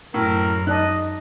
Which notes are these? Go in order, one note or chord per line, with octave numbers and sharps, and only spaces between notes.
F#2 A2 A#4
D#4 D5 D#5 A5 F#6